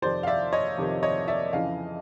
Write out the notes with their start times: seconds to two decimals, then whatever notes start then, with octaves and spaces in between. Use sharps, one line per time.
0.02 F2 C3 D#3 C5 D5
0.23 F5
0.27 D5 E5
0.53 C#5 D#5
0.78 F2 C3 D#3
1.03 C#5 D#5
1.28 D5 E5
1.53 F2 C#3 E3 D#5 F5